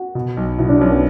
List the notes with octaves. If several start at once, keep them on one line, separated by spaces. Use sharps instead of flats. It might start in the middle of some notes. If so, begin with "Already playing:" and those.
Already playing: F#4
B2
B1
B2 E4
D4
B1 C#4
B3